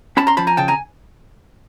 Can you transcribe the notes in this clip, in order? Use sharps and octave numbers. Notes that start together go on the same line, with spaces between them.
C#4 A5 B5
A#5 C6
F3 A5 B5
G#5 A#5
C#3 G5 A5
G#5 A#5